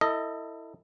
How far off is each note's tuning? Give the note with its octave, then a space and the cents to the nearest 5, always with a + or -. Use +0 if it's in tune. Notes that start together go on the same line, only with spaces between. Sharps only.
E4 +0 A4 +35 D#5 +0